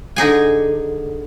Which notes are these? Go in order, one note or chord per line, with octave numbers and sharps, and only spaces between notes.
D3 D#4 G#4 G#5